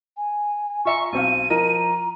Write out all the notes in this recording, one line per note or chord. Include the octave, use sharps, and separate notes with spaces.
G#5
F4 E5 A#5 C#6
B1 C4 F5 D#7
F3 A#4 D#5 A#5